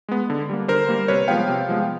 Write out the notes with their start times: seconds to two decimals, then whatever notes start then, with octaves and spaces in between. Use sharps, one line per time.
0.09 G#3 B3
0.30 D3
0.50 G3 A#3
0.68 D3 A#4 C5
0.88 G3 A#3
1.08 C3 B4 C#5
1.28 F3 G#3 B3 F5 G5
1.49 C3
1.69 F3 G#3 B3